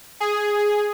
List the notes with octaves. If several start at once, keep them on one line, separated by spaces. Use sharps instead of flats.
G#4